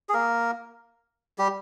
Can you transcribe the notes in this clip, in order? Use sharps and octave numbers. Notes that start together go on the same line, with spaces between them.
G#4
A#3 A#4
G3 G4